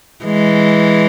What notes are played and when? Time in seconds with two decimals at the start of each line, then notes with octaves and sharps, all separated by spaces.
0.24 E3 G#3